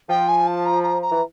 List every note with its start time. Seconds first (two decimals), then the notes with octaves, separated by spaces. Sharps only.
0.09 F3 G5
0.28 G#5
0.47 A5
0.65 A#5
0.83 A#5
1.02 A#5
1.11 E3